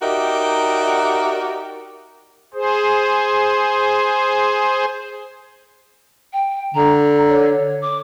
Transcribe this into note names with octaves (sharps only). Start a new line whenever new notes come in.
D#4 F#4 G4 A#4 D5 E5
G#4 C5
G5
D3 A#5
C#5
D6